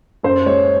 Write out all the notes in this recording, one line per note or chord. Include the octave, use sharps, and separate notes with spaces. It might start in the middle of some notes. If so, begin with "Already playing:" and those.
F#2 C5
G#3 C#5